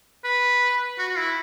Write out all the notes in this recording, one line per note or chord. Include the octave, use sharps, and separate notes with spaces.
B4
F#4
F#4
E4